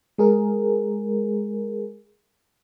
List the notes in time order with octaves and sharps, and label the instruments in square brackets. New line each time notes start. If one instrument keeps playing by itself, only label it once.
[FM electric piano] G#3 G#4 A#4